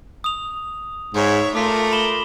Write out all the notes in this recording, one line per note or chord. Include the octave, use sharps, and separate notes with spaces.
D#6 F7
G#2 C#5 E5
A3 F4 A#4 D6 B6
B5 E7 G7